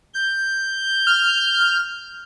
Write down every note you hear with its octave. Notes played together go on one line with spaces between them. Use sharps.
G6
F6